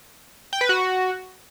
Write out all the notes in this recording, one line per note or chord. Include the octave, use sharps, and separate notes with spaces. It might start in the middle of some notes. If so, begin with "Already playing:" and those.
G5
B4
F#4